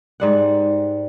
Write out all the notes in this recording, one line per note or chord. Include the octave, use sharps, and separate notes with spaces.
G#2 G3 F#5